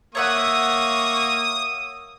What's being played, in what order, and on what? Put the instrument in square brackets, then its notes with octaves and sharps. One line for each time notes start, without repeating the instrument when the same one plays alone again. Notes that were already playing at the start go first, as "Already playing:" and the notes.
[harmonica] A#3 C#6 [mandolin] C#5 E5 F#5 [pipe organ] D#6